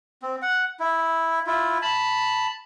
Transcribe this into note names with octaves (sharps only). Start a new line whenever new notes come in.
C4
F#5
E4
E4 F4
A5 B5